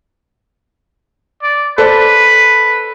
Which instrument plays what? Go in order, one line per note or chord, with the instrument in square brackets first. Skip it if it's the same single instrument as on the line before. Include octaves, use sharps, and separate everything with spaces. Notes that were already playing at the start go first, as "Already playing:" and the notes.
[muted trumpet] D5
[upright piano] A4 C5 D5 [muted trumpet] B4